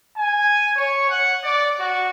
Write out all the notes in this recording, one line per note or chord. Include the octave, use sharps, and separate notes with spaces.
G#5
C#5
F#5
D5
F#4